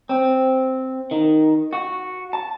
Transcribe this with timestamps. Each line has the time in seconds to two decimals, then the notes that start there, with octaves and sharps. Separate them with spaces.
0.09 C4
1.11 D#3
1.73 F#4
2.33 A5